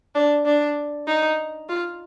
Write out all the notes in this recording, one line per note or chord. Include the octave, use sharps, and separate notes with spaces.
D4
D4
D#4
F4